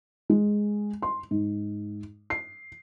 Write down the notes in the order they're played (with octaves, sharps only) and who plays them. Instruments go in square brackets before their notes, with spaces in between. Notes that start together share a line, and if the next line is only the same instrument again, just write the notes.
[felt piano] G#3
C6
G#2
C7